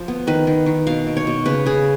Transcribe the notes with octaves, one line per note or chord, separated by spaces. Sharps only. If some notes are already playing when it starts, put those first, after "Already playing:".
Already playing: F3
B3
D#3 B4
D#3
D#3
B2 F5
B2
C#5
B2
C#3 B4
C#3 G#4